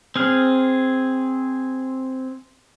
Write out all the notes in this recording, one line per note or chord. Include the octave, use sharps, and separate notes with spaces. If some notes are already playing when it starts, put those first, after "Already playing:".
C4 G#4 F6